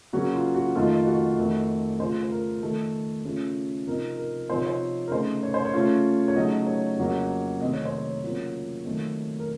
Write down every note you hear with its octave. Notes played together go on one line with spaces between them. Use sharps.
C#3 F#3 A#3 C#4 F#4
F4
F#4
F2 D#3 A3 D#4 F4
F#4
F2 D#3 A3 C4
C#3 A3 C#4 F4 C5
C5
A#4
D#3 A3 D#4 A4
C#3 A3 C#4 F4
C3 F3 C4 D#4 A#4
A#4
C3 F3 C4 D#4 C5
C#5
C5
A#4
C#3 A3 D#4 C5
C#5
C5
C#5
C#3 A3 C#4 F4
C#5
C#3 F#3 A3 D#4 D#5
C#5
F2 C#3 F#3 A#3
C3 D#3 A3 C4 D#5
C#5
C5
C#5
C#3 F#3 A#3 F4
D#3 F#3 A3 C4
A#4